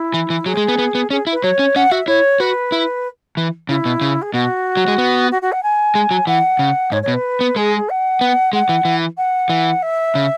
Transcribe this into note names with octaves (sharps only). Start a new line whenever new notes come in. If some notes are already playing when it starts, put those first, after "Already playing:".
Already playing: E4
E3
E3
F#3 G#4
G#3
B3
B3
B3
C#4 G#4
E4
B4
F#3 C#5
C#4
C#4 F#5
F#4 E5
E4 C#5
F#4 B4
E4
E3
C#3 E4
B2
C#3
G#4
B2 F#4
F#3
G#3
B3
F#4
F#4
F#5
G#5
G#3
F#3
E3 F#5
C#3
G#2 C#5
C#5
B2
B4
B3
G#3 G#4
F#5
B3
G#3 F#5
E3
E3
F#5
E3
E5
C#3